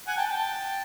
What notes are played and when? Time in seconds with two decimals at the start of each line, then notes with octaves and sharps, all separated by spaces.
0.07 F#5 G#5
0.17 G5 A5
0.28 G5 A5